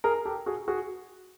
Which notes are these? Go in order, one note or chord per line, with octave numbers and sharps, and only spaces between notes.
G#4 A#4
G4 A4
F#4 G#4
F#4 G#4